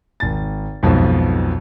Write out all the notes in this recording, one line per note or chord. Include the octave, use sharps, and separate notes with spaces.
G#1 A6
B1 F2 G#2 B2 F3